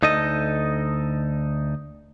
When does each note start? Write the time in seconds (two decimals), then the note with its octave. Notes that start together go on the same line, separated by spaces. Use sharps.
0.02 D2 D#4 A4 D#5